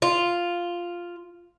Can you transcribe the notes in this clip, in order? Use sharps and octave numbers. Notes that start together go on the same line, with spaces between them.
F4